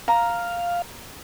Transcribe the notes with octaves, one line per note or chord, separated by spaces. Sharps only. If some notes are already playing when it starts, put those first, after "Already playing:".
F5 A#5